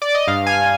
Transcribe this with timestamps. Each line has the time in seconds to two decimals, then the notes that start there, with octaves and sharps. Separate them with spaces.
0.02 D5
0.15 D#5
0.27 G2 F5
0.46 G#5